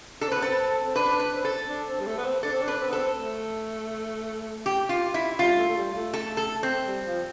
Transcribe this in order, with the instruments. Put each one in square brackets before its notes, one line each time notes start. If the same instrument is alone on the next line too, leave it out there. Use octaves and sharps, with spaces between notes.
[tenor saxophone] D4 [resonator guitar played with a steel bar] A4
[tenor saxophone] C4
[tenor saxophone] B3 [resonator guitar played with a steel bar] B4
[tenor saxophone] C4 [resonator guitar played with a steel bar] A4
[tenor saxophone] C4
[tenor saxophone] D4 [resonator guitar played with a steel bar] B4
[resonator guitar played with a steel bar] B4
[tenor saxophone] C4
[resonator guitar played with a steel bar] A4
[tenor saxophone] D4
C4
G3
A3
B3
C4
[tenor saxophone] D4 [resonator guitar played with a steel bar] A4
[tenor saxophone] C4
D4
[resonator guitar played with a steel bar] B4
[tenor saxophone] C4
B3
[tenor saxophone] C4 [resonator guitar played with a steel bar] A4
[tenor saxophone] A3
[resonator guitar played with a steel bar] G4
F4
E4
[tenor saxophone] G3 [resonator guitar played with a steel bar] F4
[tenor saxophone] A3
A3
G3
A3
[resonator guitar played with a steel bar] A4
A4
C4
[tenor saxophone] G3
F3